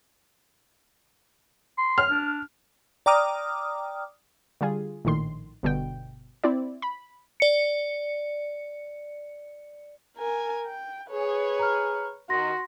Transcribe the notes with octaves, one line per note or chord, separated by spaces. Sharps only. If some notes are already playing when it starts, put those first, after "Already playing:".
C6
F6
D4
D5 G5 A#5 D6 D#6 F6
D3 G3 F4 G#4
A#1 A2 D#3 C6
G1 B2 D3 G5
C4 E4 D5
B5
D5 C#7
A#4 G#5
G5
G#4 B4 C#5
A#5 F6
D#3 F#4 C6 A#6